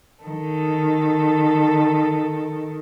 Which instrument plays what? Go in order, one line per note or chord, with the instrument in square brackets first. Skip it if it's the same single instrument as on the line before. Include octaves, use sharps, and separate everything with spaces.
[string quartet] D#3 A4